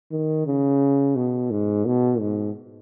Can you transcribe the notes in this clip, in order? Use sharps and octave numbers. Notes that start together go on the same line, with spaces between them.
D#3
C#3
B2
G#2
B2
G#2